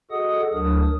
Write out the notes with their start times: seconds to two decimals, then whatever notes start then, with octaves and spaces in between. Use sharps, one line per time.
0.11 F#4 G#4 A4 D#5 F#5 D#6
0.53 D2 F#3 D4 A#4 D#6